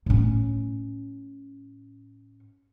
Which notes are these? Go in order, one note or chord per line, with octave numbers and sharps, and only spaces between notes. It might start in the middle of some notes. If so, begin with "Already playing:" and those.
A2 C#4